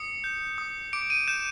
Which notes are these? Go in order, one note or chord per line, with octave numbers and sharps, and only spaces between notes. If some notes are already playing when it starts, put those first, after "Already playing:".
Already playing: D#6 C#7
G6
D#6
D6 D7
D#7
G6 E7